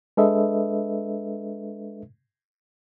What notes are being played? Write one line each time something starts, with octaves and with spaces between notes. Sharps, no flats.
G#3 D4 A4 B4 D#5 E5